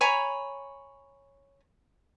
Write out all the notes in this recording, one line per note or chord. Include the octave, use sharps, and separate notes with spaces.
C#5 G#5 A#5 B5